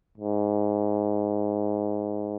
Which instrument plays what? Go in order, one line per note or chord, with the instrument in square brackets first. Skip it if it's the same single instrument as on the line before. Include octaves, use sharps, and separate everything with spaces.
[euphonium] G#2